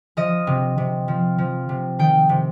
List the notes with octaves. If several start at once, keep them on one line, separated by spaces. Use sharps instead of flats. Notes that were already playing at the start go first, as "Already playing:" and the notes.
F3 D#5
C3
C3
F3
F3
C3
D#3 G5
C3